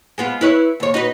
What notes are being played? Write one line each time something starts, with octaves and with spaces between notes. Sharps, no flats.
G#3 B3 F4
E4 B4 C#5
D#2 C#5
D#4 F#4 B4